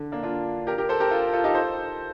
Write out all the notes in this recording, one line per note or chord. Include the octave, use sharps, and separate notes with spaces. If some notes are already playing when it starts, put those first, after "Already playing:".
Already playing: D3
A#3 D4
D4 F4
G4 A#4
G4 A#4
A4 C5
G4 A#4
F4 A4
F4 A4
D#4 G4
A4 C5